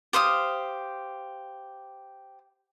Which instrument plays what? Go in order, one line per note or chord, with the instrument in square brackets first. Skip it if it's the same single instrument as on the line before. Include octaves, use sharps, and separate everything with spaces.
[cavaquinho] G4 C5 F5 D#6